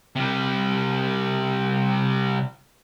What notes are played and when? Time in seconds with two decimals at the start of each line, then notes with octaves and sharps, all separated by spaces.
0.16 C3 G3